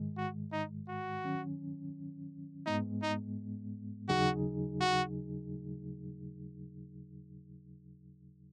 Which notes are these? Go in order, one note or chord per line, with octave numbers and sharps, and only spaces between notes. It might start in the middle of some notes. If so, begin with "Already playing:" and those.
Already playing: G#2 D#3 G#3
F#4
D#4
F#4
D#3 F#3 C#4
G#2 G#3 B3 D#4
D#4
D#2 C#3 F#3 D#4 F#4 G#4
F#4